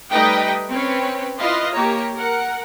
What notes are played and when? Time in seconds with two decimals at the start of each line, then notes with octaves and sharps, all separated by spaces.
0.11 G3 A3 D#4 B4 D#5 G5
0.70 C4 C#4 B4 C#5
1.39 E4 F4 B4 D#5 F5 C6
1.72 A#3 G4 C#5 A#5
2.15 A#4 F#5